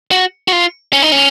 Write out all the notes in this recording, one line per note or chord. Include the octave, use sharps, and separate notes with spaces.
F#4
F#4
F4
C#4
D#4
C#4